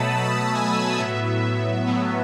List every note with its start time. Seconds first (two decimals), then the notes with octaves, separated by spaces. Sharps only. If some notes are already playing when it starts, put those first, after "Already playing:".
Already playing: B2 F#3 A3 A5 B5 D#6 E6
0.10 B2 F#3 A3 A5
0.18 B5
0.25 A5
0.51 A5
0.55 G#5
0.98 A2 F#3 B3 E5
1.87 A2 F#3 B3